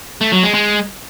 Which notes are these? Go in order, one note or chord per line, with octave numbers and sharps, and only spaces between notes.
A3
F#3
G#3
G#3